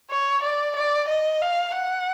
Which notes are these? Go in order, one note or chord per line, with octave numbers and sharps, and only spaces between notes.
C#5
D5
D5
D#5
F5
F#5